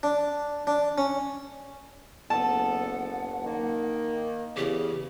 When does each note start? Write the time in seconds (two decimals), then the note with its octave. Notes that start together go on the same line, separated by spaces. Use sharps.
0.03 D4
0.67 D4
0.98 C#4
2.30 F#1 D2 B3 A4 F#5 A5
3.45 D#3 A#3
4.57 E2 C#3 G4